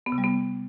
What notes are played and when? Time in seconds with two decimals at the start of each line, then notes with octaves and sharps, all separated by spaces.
0.06 B3
0.12 C3
0.18 G3
0.24 B3